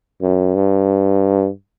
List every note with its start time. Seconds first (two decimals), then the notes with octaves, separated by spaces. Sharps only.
0.22 F#2
0.55 G2